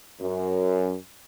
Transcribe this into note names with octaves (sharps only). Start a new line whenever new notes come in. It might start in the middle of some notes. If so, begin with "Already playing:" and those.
F#2